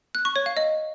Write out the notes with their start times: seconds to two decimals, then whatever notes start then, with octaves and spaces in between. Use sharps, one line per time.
0.15 F#6
0.25 C#6
0.36 C#5
0.46 F5
0.57 D#5